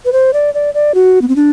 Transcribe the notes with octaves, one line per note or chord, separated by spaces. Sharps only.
B4
C5
D5
D5
D5
F#4
B3
C4
D4